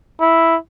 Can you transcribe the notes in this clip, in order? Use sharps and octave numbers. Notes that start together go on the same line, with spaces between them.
E4